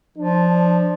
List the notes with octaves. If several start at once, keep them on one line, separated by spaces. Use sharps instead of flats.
F3 D4